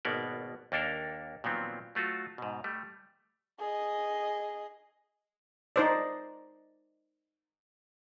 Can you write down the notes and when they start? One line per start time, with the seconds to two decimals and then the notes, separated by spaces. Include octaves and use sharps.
0.05 G#1 B2 A#3 B3 D5
0.72 D#2 A#3 D4 A4 A#4
1.44 A#2 D#3 F3 F#3 B3 C4
1.95 F#3 A3 F4 F#4
2.38 G#2 B2
2.64 G3 A3
3.60 G#4 D#5
5.76 D#4 C5 D5